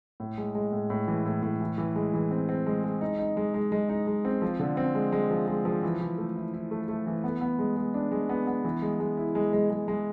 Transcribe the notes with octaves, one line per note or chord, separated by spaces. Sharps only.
A2
G#3
G#3
A2
A2
E3
A2
A2
E3
E3
G#3
E3
C4
C4
G#3
G#3
D#4
D#4
G#3
G#3
G#3
D#4
G#3
C4
F3
D3
C4
G#3
G#3
F3
G#3
F3
E3
E3
A3
E4
E4
A3
A3
E3
B3
B3
G#3
G#3
D4
G#3
B3
B3
E3
G#3
G#3
E4
G#3
G#3
G#3
G#3